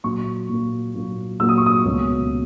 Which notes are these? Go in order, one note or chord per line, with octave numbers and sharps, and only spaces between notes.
A#2 F#3 A#3 C#6
A#2 F#3 A#3
A#2 F#3 A#3
A#2 F#3 A#3 E6
D#6
C#6
D#6
C#2 B2 A#3 C#4